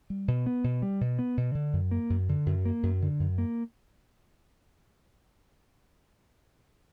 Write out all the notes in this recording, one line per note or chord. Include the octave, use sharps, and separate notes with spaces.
G3
B2
B3
B2
G3
B2
B3
B2
D3
F#2
A#3
F#2
D3
F#2
A#3
F#2
D3
F#2
A#3